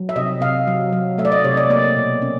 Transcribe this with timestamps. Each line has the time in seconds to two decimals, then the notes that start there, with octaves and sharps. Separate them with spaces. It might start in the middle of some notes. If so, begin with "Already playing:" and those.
Already playing: F#3
0.09 E5
0.16 C3 D#5
0.41 C3 F5
0.67 F#3
0.93 F#3
1.18 A3 E5
1.25 D5
1.32 D#5
1.44 C3 C#5
1.57 D5
1.70 A#3 D5
1.97 B2
2.22 C#4